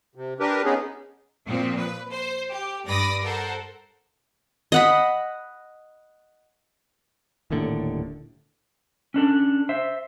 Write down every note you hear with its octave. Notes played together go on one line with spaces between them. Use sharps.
C3
D4 G4 A#4 B4
G#3 B3 C#4 D#4 G#4
A#2 F3 C4
B4
C5
G4
G2 D5 B5 D#6 A#6
A4 A#4 C5 F#5
D#5 F#5 B5
D#1 D#2 A2 D3
C#4 D4 A4
C5 E5